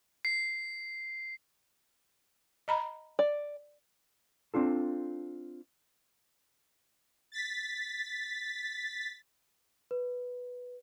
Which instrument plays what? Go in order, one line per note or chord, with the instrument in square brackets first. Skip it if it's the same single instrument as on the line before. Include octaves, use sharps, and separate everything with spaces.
[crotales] C7
[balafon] D#5 A#5 B5
[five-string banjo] D5
[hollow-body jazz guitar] C4 D4 F4 A4
[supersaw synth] A6 B6
[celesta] B4